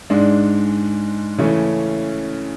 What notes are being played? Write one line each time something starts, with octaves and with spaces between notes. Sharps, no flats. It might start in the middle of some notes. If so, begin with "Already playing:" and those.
G#2 G#3 D4
C#3 E3 A3 C#4